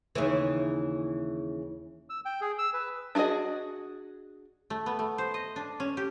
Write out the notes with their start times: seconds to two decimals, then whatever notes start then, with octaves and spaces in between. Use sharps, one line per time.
0.15 D#2 C#3 E3
2.10 E6
2.25 G5
2.41 G#4
2.58 E6
2.73 B4
3.15 D4 F4 F#4 G#4 D#5
4.70 A3
4.86 B3
4.99 A3
5.18 C5
5.34 D#5
5.56 D4
5.80 C#4
5.97 G4